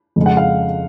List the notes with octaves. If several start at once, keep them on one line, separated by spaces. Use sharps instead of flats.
F2 C#3 G#3
F#5
F5